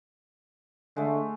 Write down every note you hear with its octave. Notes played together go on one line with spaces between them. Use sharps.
D3 G#3 A3